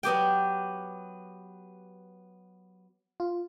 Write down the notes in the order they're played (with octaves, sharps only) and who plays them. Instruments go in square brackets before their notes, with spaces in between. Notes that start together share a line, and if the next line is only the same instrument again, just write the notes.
[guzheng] F#3 B3 G4 G5
[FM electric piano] F4